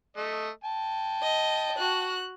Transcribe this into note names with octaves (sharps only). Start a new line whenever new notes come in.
A3 D#5
G5 A5
D#5
F#4 F#6